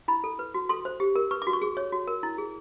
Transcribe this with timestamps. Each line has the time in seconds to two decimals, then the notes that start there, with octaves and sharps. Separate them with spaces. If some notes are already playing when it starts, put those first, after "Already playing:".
0.08 E4 B5
0.24 A4
0.39 B4
0.54 F#4
0.69 A4 C6
0.85 C5
1.00 G4
1.16 A#4
1.31 B4 C#6
1.42 D6
1.47 F#4
1.53 C#6
1.62 G#4
1.77 C#5
1.92 F#4
2.08 A#4
2.23 E4
2.38 G#4